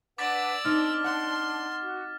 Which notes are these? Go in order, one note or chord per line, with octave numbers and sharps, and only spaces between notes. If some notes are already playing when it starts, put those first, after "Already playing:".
D4 B4 D5 F#5 D6 E6 A6 B6
C4 D4 D#4 A5 F6
F#5 C6
F#4